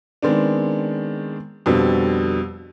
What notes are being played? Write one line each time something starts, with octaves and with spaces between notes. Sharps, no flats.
D#3 G#3 B3 C4 D4
F2 B2 D3 G3